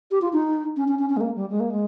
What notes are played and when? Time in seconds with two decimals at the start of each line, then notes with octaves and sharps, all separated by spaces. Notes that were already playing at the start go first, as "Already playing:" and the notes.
0.11 G4
0.22 F4
0.33 D#4
0.77 C#4
0.88 C#4
0.99 C#4
1.09 C#4
1.17 G#3
1.21 A#3
1.36 G3
1.50 G#3
1.60 A#3
1.70 G#3